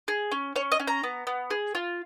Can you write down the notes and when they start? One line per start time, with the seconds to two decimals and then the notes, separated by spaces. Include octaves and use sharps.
0.08 G#4
0.32 C#4
0.56 C#4 C#5
0.72 D#5
0.80 C#4
0.87 A#5
1.03 B3
1.27 B3
1.50 G#4
1.75 F4